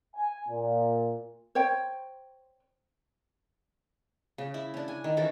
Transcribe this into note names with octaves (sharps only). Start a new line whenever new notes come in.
G#5
A#2
C5 C#5 G5
C#3
E4
C#4 D4
G#5
D#3
E3 C#4 A4